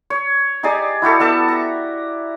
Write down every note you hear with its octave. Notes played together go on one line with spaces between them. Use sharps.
C#5
D#4 G4 G#4 D5
E4 F#4 G4 A4
B3 A4 E5 A5
A#5